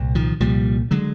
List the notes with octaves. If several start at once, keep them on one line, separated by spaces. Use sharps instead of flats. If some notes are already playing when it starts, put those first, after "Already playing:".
Already playing: C2 A#2
D#3 F3
C2 A#2 F3 G3
D3 F#3 G#3